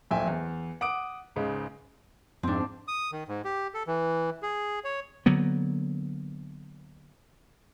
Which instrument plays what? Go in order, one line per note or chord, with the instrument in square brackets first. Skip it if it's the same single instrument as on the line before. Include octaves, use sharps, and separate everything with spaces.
[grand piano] D1 F2 A#2 E5 G5 G#5
E2
F#5 D6 D#6 D7
C#2 G#2 C#3
[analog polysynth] F2 G#2 [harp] C4 D4
[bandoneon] D#6
D#3
G#2
G4
A4
E3
G#4
C#5
[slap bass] D3 F#3 A#3 B3